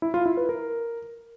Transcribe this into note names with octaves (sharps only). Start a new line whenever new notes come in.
E4
F4
E4
B4
A#4